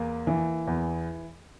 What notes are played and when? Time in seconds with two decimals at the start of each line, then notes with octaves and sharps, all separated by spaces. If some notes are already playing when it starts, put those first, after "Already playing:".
Already playing: E2 A#3
0.27 E3
0.67 E2